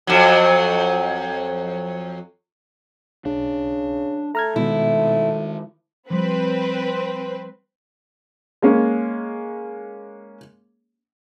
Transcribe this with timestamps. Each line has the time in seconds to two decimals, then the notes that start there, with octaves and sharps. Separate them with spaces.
0.07 F2 F#3
3.25 B1 C#3 D4
4.35 A3 A#5 F6 G#6
4.56 B2 D#3 G#3 E4
6.10 F3 G3 C4 B4
8.62 G#3 A#3 C#4